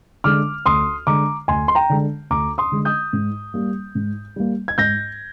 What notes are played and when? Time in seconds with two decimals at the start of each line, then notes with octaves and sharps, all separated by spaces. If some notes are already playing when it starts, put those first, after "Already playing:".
0.24 D3 G#3 D6 F6
0.66 D2 C6 D#6
1.07 D3 G#3 A#5 D6
1.48 D2 G#5 C6
1.68 C6
1.75 G5 A#5
1.90 D3 G#3
2.30 D2 A#5 D6
2.58 C6 D#6
2.72 D3 G#3
2.85 D#6 G6
3.13 G#2
3.54 G3 A#3
3.95 G#2
4.36 G3 A#3
4.68 G#6
4.78 G#2 G6 A#6